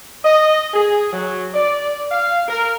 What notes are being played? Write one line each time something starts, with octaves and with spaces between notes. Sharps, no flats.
D#5
G#4
F#3
D5
F5
A#4